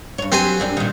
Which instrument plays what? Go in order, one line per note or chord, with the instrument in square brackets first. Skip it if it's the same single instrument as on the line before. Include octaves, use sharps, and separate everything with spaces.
[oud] G2 C#5
[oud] F#3 G4 B4 [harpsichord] C4 C5 G#5
[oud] F#2 G3 D4
A#2 D#3